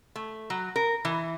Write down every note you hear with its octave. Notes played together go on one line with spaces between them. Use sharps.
A3
F#3
A#4
E3